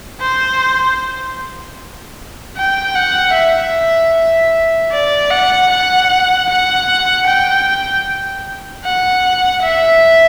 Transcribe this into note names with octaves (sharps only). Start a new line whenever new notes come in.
C5
G5
F#5
E5
D5
F#5
F#5
F#5
G5
F#5
E5